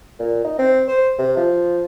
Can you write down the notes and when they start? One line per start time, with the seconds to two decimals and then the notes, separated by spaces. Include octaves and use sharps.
0.19 A#2
0.44 D#4
0.59 C4
0.88 C5
1.19 C3
1.37 F3